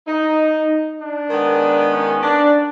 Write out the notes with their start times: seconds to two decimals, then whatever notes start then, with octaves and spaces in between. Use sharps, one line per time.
0.08 D#4
1.00 D4
1.30 D#3 G#3 B3
1.91 C#4
2.23 D4